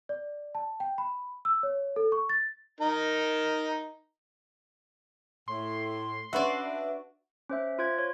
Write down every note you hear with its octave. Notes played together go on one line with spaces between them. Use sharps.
D5
A5
G5
B5
E6
C#5
A4
C#6
A6
D#4 A#4
A2 C6
C#4 D4 F#4 B4 D5 E5
C#4 C5 E5
F4 C5 G#6
C#5